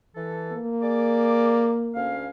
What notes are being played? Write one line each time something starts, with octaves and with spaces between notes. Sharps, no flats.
E3 A4
A#3
G#4 D5 D6
D2 C#4 F5